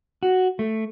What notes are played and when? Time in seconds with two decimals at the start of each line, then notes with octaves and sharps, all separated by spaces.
0.23 F#4
0.59 A3